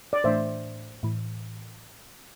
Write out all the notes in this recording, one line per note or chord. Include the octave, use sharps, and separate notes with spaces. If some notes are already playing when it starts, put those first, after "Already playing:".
D5
A2 E3 A3 D4 C5 E5
A2 E3